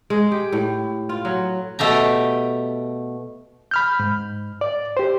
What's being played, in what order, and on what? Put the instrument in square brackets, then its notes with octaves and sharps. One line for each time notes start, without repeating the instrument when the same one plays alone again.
[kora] G#3
G4
A2
F4
F#3
[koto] B2 A3 G4 A#5
[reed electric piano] B5 F6 G6
G#2
D5
G4 C5